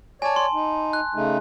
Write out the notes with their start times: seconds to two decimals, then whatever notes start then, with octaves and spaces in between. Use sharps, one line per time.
0.22 C#5 D5 G#5 A5
0.36 C6
0.54 D#4
0.93 F#6
1.14 C#3 A3 D#4